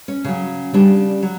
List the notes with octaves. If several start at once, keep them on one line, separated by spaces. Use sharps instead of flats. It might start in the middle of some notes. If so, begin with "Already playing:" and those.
C#4
C#3 F#3
C#3 G3 D4
F#3